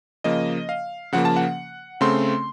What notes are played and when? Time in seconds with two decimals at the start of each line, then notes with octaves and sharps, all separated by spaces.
0.24 C#3 F3 A#3 D#5
0.69 F5
1.12 C#3 F3 A#3 F#5
1.25 A5
1.36 F#5
2.01 C#3 A3 C4 C6